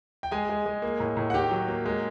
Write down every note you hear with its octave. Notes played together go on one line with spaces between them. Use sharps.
G5
G#3 G#4 G#5
G#3
G#3
A#3
A2
A2
F#5
D#3 G4 G5
F#3
A#3
G#3